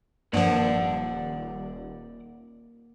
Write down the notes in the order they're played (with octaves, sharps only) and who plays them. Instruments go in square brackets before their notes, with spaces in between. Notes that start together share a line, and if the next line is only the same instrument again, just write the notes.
[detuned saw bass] D#1 [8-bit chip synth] G2 F3 [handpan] A#3 [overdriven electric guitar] D5 F#5